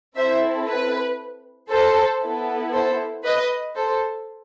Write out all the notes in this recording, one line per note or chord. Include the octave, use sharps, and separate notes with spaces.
C4 E4 A4 C5 E5
B4
A4 C5
B3 E4 A4
A4 C5
B4 D#5
A4 C5